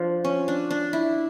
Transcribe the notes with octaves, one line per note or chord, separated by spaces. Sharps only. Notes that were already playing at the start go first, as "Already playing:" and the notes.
Already playing: F3 D4
C#4
D4
D4
E4